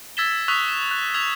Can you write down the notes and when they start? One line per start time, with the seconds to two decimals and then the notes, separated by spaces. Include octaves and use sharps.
0.17 E6 G#6 A6 B6 E7 G7
0.48 C#6 D#6 E6 F#6 B6 F7
0.68 E7
0.91 F#6
1.14 E6 G#6 B6 F7